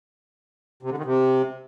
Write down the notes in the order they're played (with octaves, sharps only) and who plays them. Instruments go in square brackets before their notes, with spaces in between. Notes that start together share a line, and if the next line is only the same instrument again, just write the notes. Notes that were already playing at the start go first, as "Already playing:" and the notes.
[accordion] C3
D3
D#3
C3